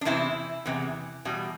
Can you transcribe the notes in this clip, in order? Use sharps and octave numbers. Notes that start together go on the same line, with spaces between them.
D4
E2 C3 E3 E4
E2 C3 E3
E2 B2 G3